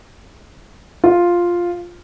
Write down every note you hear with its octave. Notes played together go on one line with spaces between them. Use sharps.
F4